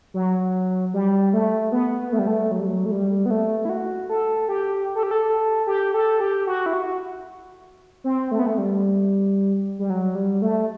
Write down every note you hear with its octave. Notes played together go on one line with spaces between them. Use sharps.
F#3
G3
A3
B3
A3
G3
A3
F#3
G3
F#3
A3
G3
B3
A3
E4
F#4
A4
G4
A4
G4
A4
G4
A4
G4
F#4
E4
F#4
C4
A3
B3
A3
G3
G3
F#3
G3
A3